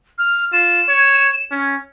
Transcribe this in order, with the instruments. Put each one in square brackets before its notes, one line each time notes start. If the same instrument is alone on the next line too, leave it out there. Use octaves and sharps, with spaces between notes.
[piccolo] F6
[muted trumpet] F4 [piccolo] E7
[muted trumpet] C#5
C#4